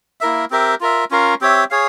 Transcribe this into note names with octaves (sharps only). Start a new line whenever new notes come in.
A#3 E4 A#4 E5
C4 G4 A#4 E5
F4 A#4 E5
C#4 F4 A#4 F5
C4 G4 C#5 E5
G#4 C#5 F5